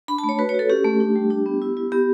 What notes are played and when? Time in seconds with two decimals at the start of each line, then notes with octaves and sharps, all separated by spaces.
0.08 D4 B5
0.19 A5
0.24 A3
0.29 C#5
0.39 F#4 B4
0.49 C#5
0.54 F#4 A4
0.70 C#4 G4
0.84 A3
1.00 D4
1.16 G3
1.31 D4
1.46 B3
1.62 E4
1.77 E4
1.92 B3 G4